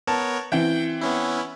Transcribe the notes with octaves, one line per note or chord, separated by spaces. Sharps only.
B3 A#4 C#5 A5
E3 C4 G5
B3 C#4 E4